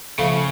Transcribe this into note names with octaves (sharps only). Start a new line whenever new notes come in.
C#3 F3 A3